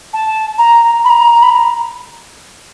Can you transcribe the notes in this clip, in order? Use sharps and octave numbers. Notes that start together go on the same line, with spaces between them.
A5
A#5
B5
A#5
A#5
B5
A#5